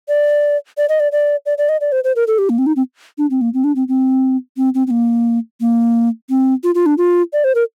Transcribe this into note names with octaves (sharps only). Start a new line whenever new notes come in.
D5
D5
D#5
D5
D5
D5
D5
D#5
D5
C5
C5
A#4
A4
G4
A#3
C4
D#4
C4
D4
C4
A#3
C4
D4
C4
C4
C4
C4
C4
A#3
A#3
C4
F4
F4
D4
F4
D5
C5
A#4